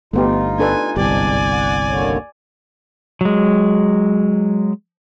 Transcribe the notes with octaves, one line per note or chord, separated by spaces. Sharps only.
G1 A3 B3 D#4 F4 G4
D4 A4 B4 G#5
G1 C2 G#2 D4 G4 D5 G#5
F#5
D#2 D3 C#5
F#3 G#3